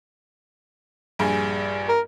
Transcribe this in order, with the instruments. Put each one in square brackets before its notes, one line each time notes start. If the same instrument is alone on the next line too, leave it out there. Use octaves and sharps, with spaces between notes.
[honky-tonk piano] A#1 G2 G#4
[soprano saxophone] A#4